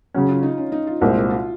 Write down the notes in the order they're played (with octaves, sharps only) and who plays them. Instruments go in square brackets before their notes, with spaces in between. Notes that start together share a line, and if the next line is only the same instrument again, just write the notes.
[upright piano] C#3 F#3 C#4
[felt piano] F4
D#4
C#4
D#4
F4
[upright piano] C2 A#2 G#3 C4 [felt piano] F#4
[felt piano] F4